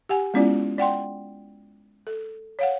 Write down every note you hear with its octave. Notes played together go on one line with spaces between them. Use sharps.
G4 F#5 G#5
G#3 B3 C#4 E4 F4 D5
D5 F#5 G5 C6
A4
C#5 F5 F#5